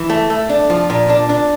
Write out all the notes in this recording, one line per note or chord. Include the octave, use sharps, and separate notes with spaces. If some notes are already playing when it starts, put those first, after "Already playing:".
Already playing: E3
A3
A3
D4
F3
A#2
D4
D4